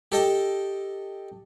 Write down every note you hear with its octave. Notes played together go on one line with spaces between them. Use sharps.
G4 A4 D#5 G5